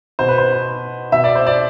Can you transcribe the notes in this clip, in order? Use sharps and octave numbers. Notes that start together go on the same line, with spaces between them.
B2 C5
B4
C5
B2 E5
D5
C5
D5